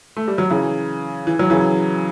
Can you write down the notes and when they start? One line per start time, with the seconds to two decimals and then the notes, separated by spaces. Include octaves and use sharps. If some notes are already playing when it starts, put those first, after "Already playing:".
0.17 A3
0.28 G3
0.38 F#3
0.50 C#3 E3
1.27 E3
1.39 F#3
1.50 C#3 E3